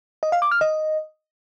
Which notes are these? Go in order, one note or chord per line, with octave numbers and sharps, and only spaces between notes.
D#5
F5
D6
F6
D#5